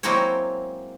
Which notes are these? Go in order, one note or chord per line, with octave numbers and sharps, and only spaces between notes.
F#3 G#3 A#3 C4 E4 C#5